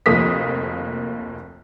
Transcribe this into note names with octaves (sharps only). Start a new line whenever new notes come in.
F1 D2 F3 A#3 D#6 B6